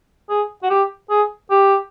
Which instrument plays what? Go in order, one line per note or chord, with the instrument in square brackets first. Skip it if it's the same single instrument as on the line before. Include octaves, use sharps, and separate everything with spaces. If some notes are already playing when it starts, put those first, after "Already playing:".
[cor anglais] G#4
F#4
G4
G#4
G4